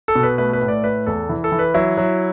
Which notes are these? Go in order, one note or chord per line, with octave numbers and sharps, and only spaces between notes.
A4
B2
B4
A3 B4
B4
A2
D5
A3 B4
E2 A4
E3
A4
E3
B4
F#3 E4
F#3